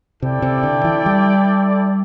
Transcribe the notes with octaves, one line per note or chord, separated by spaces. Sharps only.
C3 E4 A4 D5 G5
C3
D3
E3
G3